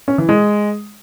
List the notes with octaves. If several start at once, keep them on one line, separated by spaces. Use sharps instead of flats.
C#4
E3
G#3